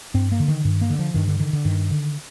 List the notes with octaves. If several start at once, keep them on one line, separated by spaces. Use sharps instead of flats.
G2 C4
A#3
D3
D#3
G2 D#3
A#3
D3
F3
G2 D#3
D3
D3 D#3
D3
G2 D#3
D3